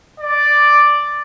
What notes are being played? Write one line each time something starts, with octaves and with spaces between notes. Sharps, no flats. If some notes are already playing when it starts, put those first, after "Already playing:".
D5